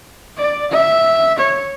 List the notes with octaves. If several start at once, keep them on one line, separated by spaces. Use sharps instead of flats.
D5
E5
C#5